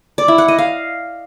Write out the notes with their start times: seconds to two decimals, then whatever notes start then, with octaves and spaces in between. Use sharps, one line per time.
0.18 D5
0.28 E4
0.38 F#5
0.48 D#5
0.58 F5